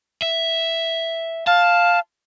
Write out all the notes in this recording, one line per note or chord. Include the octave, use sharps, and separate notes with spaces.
E5
F5 A5